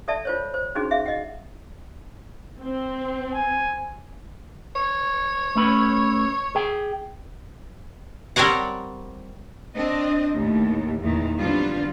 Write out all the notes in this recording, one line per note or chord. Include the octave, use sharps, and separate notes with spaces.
A4 D5 E5 A5
F4 C5 C#5
C5
C#4 D#4 F#4 G#4
G#4 E5 F5
D#5 F#5
C4
G#5
C#5
A3 C#4 B4
G#4 G5
G3 C4 A#4 C#5 F#5
C4 D4 D#5
D#2 A2
E2 A#2 D#3
D3 F#3 G3 B3 C4 F4